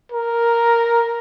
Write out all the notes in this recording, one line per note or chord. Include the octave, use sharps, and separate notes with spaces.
A#4